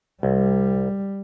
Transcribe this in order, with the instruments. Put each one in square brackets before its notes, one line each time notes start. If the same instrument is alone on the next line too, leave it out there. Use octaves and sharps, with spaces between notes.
[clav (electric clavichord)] C2 [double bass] G3